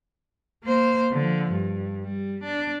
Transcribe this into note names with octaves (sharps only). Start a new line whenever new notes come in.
A#3 C5
D3 F3
G2
G3
D4